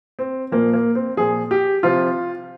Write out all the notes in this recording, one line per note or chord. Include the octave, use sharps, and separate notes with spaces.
C4
A#2 F3 A#3
A#3
C4
A#2 F3 G#4
G4
C3 F3 F4